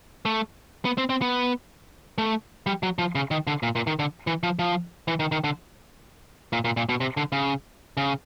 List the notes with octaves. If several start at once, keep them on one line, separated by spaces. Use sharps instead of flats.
A3
B3
C4
C4
B3
A3
G3
F#3
F3
C#3
D#3
D3
A#2
A#2
D#3
D3
E3
F3
F3
E3
D#3
D#3
D3
A#2
A#2
A#2
B2
C3
D3
C#3
C#3